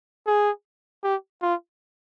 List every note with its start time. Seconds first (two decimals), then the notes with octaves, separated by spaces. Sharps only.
0.27 G#4
1.03 G4
1.42 F4